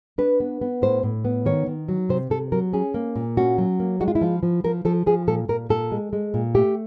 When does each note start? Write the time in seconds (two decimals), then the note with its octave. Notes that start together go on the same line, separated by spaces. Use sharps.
0.18 D4 B4
0.40 B3
0.61 B3
0.82 A2 C5
1.03 A2
1.25 B3
1.45 D#3 C#5
1.67 D#3
1.89 F#3
2.09 C3 C5
2.30 C3 A4
2.52 F#3 A#4
2.73 C#4 G#4
2.94 A#3
3.16 A#2
3.37 C#4 F#4
3.58 F#3
3.80 A#3
4.00 G#3 F#4
4.08 F4
4.15 E4
4.21 F3 F4
4.43 F3
4.64 F3 A#4
4.85 F3 A4
5.06 F3 G#4
5.27 A#2 A4
5.48 A#2 A#4
5.69 A#2 A4
5.92 G#3
6.13 G#3
6.34 A#2
6.55 A3 G4